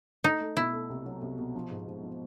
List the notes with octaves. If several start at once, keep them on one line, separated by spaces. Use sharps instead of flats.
A3 D#4
A3
B2 E4
A3
C2
F#3
C2
B2
F3
G#2
G#2
F3